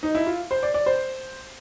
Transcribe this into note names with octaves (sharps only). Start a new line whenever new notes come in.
D#4
E4
F4
C5
D5
D5
C5